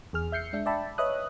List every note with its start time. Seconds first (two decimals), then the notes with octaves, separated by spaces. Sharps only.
0.13 E2 G#4 F6
0.32 E5 G6 C7 C#7
0.53 G#3 D4 E5
0.66 D5 E5 G5 A5 B5
0.98 B4 C#5 D#5 E5 D#6 F#6